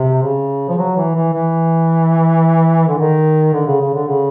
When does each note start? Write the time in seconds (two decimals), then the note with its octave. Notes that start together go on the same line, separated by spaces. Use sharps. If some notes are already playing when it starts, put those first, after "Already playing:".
Already playing: C3
0.23 C#3
0.69 F3
0.78 F#3
0.97 E3
1.15 E3
1.33 E3
2.88 D3
2.99 D#3
3.53 D3
3.67 C#3
3.81 C#3
3.94 D3
4.08 C#3